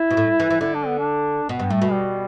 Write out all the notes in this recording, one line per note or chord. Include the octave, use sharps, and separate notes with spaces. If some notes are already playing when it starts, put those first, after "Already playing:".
Already playing: E4
B2
A2
E3
E3
D3 E4
D4
B3
D4
B2 B3
G2
A2 A3
B2
G3